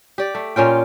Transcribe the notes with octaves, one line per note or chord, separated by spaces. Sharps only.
G4 D5
A3
A#2 C#4 F4 G5